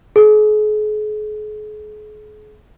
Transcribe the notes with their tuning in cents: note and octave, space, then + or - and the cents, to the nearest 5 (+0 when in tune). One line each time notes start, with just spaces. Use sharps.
G#4 +40